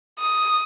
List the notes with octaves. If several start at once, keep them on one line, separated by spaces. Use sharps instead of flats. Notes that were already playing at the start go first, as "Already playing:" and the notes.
D#6